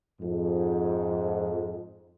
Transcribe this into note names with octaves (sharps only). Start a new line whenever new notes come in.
F2 G#2